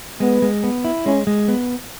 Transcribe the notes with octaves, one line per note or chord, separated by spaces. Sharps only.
G#3 B3
G#3
B3
E4
G#3 C#4
G#3
B3